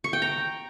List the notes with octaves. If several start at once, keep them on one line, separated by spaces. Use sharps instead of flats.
C#6
G5
A#5